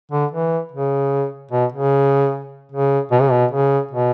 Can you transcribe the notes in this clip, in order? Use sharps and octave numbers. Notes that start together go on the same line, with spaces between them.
D3
E3
C#3
B2
C#3
C#3
B2
C#3
B2
C#3
B2